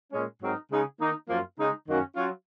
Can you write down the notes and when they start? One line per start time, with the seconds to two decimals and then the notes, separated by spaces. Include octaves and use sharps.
0.13 A#2 G#3 C#4
0.42 G#2 F#3 C4 D#4 A#4
0.70 C#3 G#3 D#4 G#4
1.01 D#3 A#3 D#4
1.29 F#2 F3 A#3 F4
1.57 C#3 G#3 D#4
1.88 F#2 D#3 A#3 C#4 F#4
2.16 F#3 C#4 F4